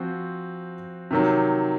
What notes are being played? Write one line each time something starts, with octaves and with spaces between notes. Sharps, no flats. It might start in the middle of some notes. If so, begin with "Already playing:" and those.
Already playing: F3 C4 F#4
C3 D#3 F#3